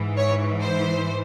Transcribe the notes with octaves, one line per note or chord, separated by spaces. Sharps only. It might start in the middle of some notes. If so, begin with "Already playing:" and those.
Already playing: G#2 E3
C#5
C5